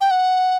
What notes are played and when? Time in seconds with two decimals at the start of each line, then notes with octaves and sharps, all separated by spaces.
0.01 G5
0.11 F#5